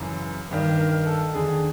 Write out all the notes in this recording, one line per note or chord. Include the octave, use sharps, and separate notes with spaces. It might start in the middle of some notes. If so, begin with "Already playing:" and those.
Already playing: F#2 C#3 E3
G2 D#3
A#4
A4
D#2 D3 G#4